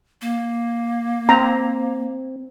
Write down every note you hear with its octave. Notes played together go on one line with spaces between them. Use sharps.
A#3
C4 A#5